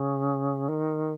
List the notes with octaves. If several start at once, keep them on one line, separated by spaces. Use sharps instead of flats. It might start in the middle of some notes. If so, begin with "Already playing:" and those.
Already playing: C#3
D#3